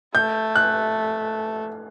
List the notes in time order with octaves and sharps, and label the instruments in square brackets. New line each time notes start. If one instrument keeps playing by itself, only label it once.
[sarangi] A3 [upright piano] G6
[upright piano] F#6